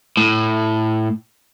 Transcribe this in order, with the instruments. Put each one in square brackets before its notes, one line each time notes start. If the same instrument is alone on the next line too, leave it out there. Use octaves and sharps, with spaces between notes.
[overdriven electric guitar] A2